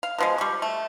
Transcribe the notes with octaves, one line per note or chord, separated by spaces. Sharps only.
F5
B2 F3 G#3
G3 C#6
A3